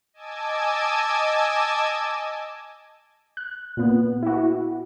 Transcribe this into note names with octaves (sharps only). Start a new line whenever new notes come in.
D#5 G#5 A5 D6 E6 G#6
F#6
A#2 B3
E4 F#4